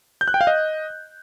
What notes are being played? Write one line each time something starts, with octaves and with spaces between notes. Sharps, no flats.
G6
F#6
G5
F5
D#5